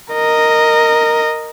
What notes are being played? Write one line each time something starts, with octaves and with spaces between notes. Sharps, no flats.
A#4 D#5